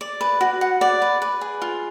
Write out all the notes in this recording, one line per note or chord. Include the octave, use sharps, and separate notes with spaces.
D5
B4
F#4
F#5
D5
B4
B4
G#4
F4